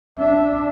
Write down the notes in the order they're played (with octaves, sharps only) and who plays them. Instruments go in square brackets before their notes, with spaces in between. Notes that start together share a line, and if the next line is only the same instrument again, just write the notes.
[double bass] D4 [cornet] E5